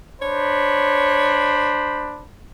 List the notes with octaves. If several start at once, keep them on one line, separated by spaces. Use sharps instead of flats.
D4 C5 C#5 B5